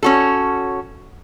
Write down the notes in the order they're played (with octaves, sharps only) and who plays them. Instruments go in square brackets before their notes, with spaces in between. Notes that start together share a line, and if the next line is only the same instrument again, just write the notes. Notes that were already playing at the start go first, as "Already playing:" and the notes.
[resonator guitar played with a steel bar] C#4 F#4 A4